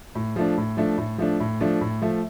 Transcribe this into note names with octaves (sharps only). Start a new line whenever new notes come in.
A2
F3 A3 D4
A2
F3 A3 D4
A2
F3 A3 D4
A2
F3 A3 D4
A2
F3 A3